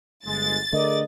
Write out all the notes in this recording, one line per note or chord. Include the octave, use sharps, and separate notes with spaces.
G1 G#3 A6
D3 A3 G#4 A#4 D5 D#5